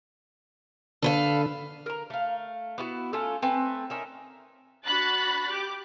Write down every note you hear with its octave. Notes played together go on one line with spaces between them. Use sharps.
D3 A4 B4 F5
A#4 A#5
A3 F5
B3 E4 F#4
A3 C#4 F4 A4
A3 C4 B4 G#5
C#4 D#4 A#4 E5
D4 F#4 B5 F#6 A6
G4 D6